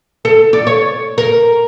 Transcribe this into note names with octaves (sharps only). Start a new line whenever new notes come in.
A4
D5
C#5
A#4